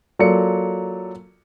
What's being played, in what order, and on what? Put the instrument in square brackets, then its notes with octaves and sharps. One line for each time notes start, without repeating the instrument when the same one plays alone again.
[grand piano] F#3 A#3 F4 A4 D5 C#7